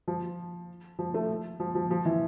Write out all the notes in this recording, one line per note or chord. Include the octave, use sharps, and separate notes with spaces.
F3
F3
A3
F3
F3
F3
E3